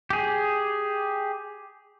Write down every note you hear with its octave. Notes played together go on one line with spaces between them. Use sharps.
G4 G#4